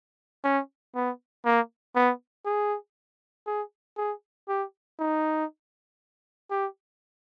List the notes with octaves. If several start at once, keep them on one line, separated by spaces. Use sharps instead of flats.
C#4
B3
A#3
B3
G#4
G#4
G#4
G4
D#4
G4